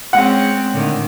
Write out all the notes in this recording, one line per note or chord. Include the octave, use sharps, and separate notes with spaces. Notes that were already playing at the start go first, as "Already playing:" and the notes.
G#3 C4 C#4 F#5
A2 D3 D#3